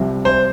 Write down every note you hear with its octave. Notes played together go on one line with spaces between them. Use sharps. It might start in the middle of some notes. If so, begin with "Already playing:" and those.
Already playing: C2 C3 F3
C5